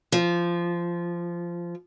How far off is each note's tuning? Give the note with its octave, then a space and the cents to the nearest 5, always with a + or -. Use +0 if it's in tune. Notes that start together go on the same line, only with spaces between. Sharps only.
F3 -15